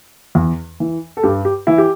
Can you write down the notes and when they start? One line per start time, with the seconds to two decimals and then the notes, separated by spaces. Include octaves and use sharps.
0.35 E2
0.80 E3
1.17 A4
1.23 G2 G4
1.45 G4
1.67 E3 E4
1.78 G4